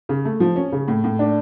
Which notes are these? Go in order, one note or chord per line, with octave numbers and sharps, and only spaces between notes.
C#3
A3
F3
C#4
C#3
A2
A2
D4